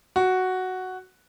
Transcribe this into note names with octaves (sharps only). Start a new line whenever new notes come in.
F#4